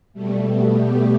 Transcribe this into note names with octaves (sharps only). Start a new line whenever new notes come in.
B2 G3 A3
B3
G4